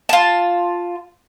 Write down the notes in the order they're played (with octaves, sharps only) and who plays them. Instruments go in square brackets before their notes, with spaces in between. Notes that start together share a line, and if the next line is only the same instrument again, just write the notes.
[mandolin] F4 A5